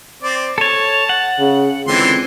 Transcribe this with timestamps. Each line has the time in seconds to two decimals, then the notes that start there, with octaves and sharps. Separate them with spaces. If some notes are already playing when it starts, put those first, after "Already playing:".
0.22 C4 D5
0.58 A4 C#5 A5
1.09 F#5
1.39 C#3
1.87 C#2 D3 E3 C4 C6